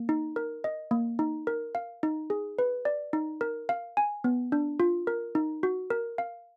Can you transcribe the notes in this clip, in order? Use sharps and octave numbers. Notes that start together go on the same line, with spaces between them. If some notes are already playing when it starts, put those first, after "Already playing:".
Already playing: A#3
D#4
A#4
D#5
A#3
D#4
A#4
F5
D#4
G#4
B4
D5
D#4
A#4
F5
G#5
B3
D4
F4
A#4
D#4
F#4
A#4
F5